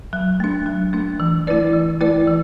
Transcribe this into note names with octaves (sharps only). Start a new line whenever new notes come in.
F#3
A3 D4
F#3
A3 D4
E3
A3 E4 B4 D5
E3
A3 E4 B4 D5
E3